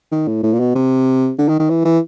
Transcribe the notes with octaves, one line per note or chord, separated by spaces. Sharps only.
D#3
A2
A2
A#2
B2
C3
D3
D#3
D#3
E3
E3